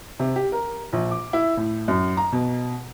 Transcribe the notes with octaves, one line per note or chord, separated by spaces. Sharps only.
C3
G4
A#4
A#1
D6
E4
A2
F#2
A#5
B2